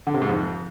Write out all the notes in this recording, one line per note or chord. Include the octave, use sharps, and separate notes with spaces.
D3
C3
G#2
F2